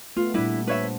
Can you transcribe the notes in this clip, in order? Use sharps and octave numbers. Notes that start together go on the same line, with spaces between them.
A3 B3 F4
A#2 G3 D4 E4 B4
D4 B4 C#5 E5
C5